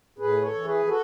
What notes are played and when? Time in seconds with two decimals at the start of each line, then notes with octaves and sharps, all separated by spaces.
0.19 A2 G#4 B4
0.41 A4 C#5
0.54 E3
0.65 G#4 B4
0.88 F#4 A4